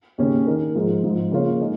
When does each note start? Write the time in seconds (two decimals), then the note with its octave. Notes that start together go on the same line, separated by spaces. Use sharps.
0.18 D#2 C#3 A#3 C#4
0.47 D#3 A#3 D#4 A#4
0.75 G#2 F3 G#3
1.03 G#2 F3 G#3
1.31 C#3 A#3 F4 C#5
1.60 G#3 D#4 G#4